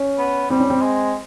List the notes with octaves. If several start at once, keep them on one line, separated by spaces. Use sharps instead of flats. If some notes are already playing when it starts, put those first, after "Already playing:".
Already playing: C#4
B3
G3 C4
C#4
C4
G#3